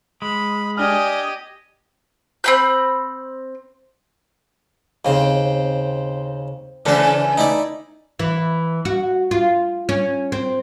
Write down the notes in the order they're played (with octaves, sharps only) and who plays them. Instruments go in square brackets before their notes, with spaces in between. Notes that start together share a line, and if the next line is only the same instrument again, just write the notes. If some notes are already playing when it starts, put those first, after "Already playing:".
[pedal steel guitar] G#3 [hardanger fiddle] B5
[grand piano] D4 F6 [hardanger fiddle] G4 D#5 [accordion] G#5 D#6
[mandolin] C4 B5 G6
[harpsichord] D#2 C#3 [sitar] C4
[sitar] C#3 E3 A4 [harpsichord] D4 C5
[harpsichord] D#4 E4 D5
[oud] E3
F#4
F4
C#4
C4